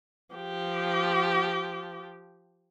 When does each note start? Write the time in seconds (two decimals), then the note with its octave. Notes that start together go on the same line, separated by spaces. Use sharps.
0.35 F3 G4